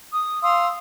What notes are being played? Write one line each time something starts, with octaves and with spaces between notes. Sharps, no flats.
D#6
F5 C6 D#6 E6